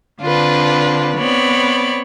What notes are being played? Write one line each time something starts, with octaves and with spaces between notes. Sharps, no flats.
D3 C4 D4 F4 B4
B3 C4 C#5 D5 B5